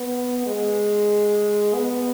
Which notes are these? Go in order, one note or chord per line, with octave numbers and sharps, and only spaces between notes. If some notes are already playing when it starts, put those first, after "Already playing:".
Already playing: B3
G#3
B3